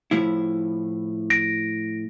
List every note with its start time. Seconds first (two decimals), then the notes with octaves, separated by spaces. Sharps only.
0.11 A2 F3 E4
1.30 A#6 D7